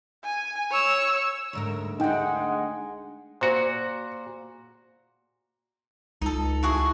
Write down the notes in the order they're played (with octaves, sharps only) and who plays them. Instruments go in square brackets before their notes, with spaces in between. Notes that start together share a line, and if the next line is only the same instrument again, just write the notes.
[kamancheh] G#5
C#5 E6
[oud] D2 G#2 A#4
[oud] D2 F#4 [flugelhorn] G#3 [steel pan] D#4 G5 [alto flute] F#5
[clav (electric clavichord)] A#2 F#4 [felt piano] C5
[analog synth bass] C#2 [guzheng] D#4 A4
[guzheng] E4 F#4 G#4